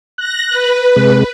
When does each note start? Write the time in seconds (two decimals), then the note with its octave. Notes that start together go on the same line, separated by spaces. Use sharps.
0.18 F#6 A#6
0.49 B4
0.96 C3 G#3